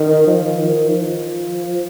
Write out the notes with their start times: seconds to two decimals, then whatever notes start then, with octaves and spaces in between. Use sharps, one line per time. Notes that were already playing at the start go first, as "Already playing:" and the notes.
Already playing: D#3
0.27 F3
0.59 D#3
0.89 F3